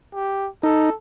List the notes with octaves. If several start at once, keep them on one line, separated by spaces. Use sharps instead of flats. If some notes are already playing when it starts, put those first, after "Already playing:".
G4
D#4 A4